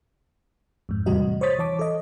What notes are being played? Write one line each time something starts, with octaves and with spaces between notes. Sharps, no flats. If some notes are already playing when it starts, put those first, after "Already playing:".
F2 G#2
E2 A2 C3 G3 F#4 D#5
C5 C#5 C#6 D#6 A6 B6
E3 C#5 A5 D6
A4 D#5